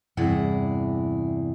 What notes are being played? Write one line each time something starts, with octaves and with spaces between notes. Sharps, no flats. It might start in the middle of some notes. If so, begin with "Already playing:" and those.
E2 G2 C3 E4 G#4 F#5